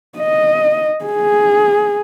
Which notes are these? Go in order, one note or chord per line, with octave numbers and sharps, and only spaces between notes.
D#5
G#4